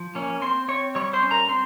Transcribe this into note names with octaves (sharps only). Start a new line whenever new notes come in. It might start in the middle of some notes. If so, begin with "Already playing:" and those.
Already playing: F3
A#3 C#4 C#5
C4 C5 C6
C4 C#5 C#6
G3 C#5 C#6
C5 C6
C#4
A#4 A#5
C4 C5 C6